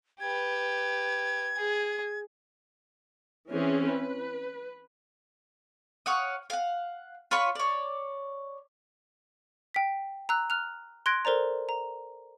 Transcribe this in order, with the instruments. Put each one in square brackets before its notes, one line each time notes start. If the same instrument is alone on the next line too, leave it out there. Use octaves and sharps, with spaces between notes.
[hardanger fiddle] G4 B4 [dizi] G#6
[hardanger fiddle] G#4
[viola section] E3 C4 C#4 G#4
B4
[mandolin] C#5 F5 F#5 D#6
F5 F#5
F4 C#5 B5 C#6
C#5 D5
[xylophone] G5 B6
A#5 E6 F#6
F6 F#6 F7
C6 F#6 G#6 A#6 D7
A4 A#4 C5 D5 A#5
A#5